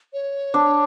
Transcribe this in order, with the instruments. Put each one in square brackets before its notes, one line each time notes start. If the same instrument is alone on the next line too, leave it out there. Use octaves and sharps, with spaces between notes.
[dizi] C#5
[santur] D4